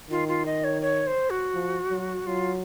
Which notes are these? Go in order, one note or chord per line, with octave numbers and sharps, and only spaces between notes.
D#3 F4
F4
D#5
C#5
C#5
C5
F#4
F3
F#3
F#3 F4